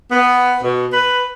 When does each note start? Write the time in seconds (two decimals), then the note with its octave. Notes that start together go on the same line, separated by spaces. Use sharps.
0.11 B3
0.62 B2
0.93 B4